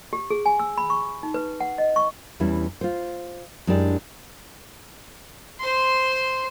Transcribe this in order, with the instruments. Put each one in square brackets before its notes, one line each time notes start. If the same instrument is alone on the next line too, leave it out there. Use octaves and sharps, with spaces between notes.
[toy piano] G4
G#4
G#5
E6
B5
C#6
D6
D#4
B4
F#5
D#5
C#6
[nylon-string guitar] E2 G3 C#4 E4
F4 C5
F#2 G#3 D4 E4 G4 D5
[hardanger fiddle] C5 C6